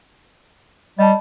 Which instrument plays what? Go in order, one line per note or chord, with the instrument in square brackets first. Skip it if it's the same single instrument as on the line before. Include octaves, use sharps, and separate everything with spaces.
[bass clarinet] G3 [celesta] D#5 A5